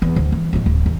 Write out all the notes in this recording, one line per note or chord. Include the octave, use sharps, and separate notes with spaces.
E2
D2
E3
F2 A2
D1
E2